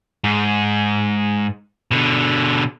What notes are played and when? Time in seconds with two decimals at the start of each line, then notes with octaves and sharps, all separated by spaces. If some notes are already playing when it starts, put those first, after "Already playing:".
0.24 G#2
1.91 B2 D3